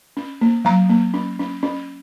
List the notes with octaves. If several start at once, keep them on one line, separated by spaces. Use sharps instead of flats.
C#4
A#3
F#3 A#5
A#3
C#4
C#4
C#4